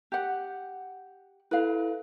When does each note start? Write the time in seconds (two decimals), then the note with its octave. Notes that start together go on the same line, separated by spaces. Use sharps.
0.12 G4 F#5
1.51 E4 A4 B4 F5